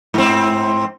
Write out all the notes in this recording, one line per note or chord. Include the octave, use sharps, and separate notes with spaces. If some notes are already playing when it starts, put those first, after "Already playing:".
G#2 C4